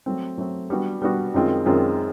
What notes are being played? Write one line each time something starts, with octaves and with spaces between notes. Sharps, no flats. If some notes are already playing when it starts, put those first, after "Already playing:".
F#3 A3 C4
F#3 A3 C4
G3 B3 D4 F#4
G3 B3 D4 F#4
F#2 D#3 G#3 C4 F4
F#2 D#3 G#3 C4 F4